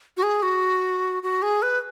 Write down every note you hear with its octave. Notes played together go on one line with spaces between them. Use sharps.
F#4
G#4
F#4
F#4
G#4
B4